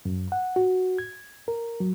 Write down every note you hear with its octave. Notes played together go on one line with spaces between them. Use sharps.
F#2
F#5
F#4
G#6
A#4
F#3